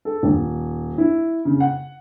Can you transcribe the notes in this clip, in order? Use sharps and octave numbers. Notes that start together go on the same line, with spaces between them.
A4
D#1
E4
C#3
F#5